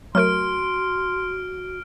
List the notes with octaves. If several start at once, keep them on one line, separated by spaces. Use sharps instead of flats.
F#3 A3 F#4 A#4 C6 F6 D7